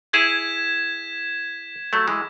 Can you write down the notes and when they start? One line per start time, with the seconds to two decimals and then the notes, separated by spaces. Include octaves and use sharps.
0.13 E4 G#4 G#6 B6 E7
1.93 F#3 A3
2.08 E3 G#3